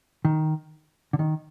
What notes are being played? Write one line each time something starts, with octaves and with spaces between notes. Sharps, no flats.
D#3
D3
D#3